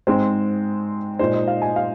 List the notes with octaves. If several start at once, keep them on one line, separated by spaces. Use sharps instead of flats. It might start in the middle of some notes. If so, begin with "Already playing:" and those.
G#2 G#3 C4 C5
A#2 G#3 D#4 C5
D#5
F5
G#5
F5